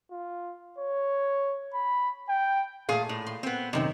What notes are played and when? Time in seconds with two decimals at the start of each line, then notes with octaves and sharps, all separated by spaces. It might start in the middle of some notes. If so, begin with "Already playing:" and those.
0.11 F4
0.78 C#5
1.74 B5
2.29 G5
2.89 A#2 A3 G#4 F5
3.09 A2
3.26 C6
3.43 B3 C4
3.73 F#2 C3 D#3 C4